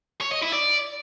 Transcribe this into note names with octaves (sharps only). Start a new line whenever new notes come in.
C#5
D#5
E4
D5